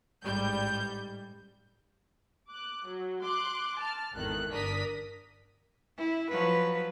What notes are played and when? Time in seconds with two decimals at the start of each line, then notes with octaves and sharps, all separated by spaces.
0.23 A1 G#2 G3 G6
2.49 D6 F#6
2.86 F#3
3.23 C6 D6 F#6
3.77 A5 F6
4.14 G#1 E2 D#3 A4 F#6
4.49 G1 D4 A#4 D#6 B6
5.97 E4
6.30 F3 F#3 B4